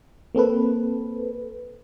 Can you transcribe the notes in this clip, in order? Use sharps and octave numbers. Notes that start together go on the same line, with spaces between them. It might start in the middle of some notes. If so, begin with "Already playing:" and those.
A#3 C4 A4 B4